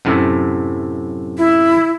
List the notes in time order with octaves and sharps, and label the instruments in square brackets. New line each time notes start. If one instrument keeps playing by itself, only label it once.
[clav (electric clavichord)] F#2 A2 C3
[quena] E4